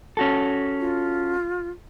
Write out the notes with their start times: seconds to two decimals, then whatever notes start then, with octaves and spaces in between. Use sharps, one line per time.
0.17 C#4 F#4 A4
0.80 F4